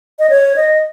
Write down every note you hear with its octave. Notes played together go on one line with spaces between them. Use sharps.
D#5
C#5
D#5